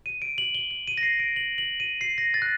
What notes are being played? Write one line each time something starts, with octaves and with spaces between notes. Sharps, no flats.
D#7
D7
F#7
G7
F#7
D#7
A#6
C7
D7
F#7
F#7
D#7
C7
A#6
A6
F#6